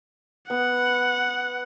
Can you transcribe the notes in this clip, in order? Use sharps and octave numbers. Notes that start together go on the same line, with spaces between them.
B3 F#5